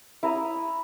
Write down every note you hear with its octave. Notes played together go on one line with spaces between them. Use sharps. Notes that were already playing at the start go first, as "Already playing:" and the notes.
E4 A#5 D#6